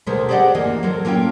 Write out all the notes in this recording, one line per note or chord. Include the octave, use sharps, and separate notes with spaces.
D2 B2 G#3 A4 A#4 C5
G4 G#4 C5 D5 D#5 F#5
D2 E3 A#3 D#5
F#3 C4 A4 A#4
A#3 C#4 F4 A4 G5